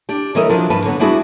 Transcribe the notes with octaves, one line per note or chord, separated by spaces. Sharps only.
D4 G4
E3 G3 C#4 A4 A#4 D#5
F3 F#3 D4 F4
G2 B4 A5
D3 F#3 B3
G3 B3 D4 E4 F#4 G#4